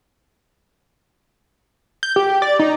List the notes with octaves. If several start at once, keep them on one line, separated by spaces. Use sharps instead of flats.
G6
G4
D5
D#4